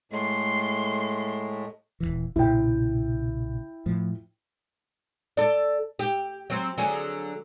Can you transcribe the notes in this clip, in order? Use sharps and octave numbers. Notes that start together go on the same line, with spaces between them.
A2 G#3 A3 C6
D#1 B1 E3
B1 A#2 C#3 E4 G5
A2 F3
A4 D5
G4
F#3 C4
D3 F#3 G#4